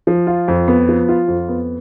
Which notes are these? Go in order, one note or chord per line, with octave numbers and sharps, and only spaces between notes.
F3
F4
F2
B3
F3
F4
F2
B3